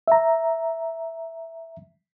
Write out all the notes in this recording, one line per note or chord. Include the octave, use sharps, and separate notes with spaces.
E5 A#5